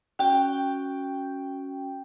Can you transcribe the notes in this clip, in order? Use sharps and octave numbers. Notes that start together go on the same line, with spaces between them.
C#4 F#4 G5